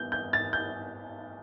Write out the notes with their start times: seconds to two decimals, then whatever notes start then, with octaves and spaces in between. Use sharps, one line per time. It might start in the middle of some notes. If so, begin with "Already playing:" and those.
Already playing: B3 G6
0.12 G6
0.33 A6
0.53 G6